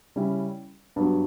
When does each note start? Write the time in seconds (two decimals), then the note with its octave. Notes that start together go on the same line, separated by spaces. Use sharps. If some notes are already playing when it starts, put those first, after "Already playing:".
0.16 C#3 G3 C#4 E4
0.96 G2 F#3 B3